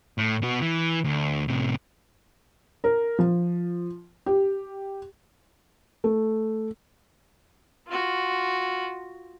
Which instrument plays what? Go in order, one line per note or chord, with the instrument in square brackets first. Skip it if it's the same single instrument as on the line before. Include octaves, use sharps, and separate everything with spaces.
[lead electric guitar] A2
B2 F#4
E3
D2
A2 C3
[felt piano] A#4
F3
G4
A3
[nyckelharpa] F4 F#4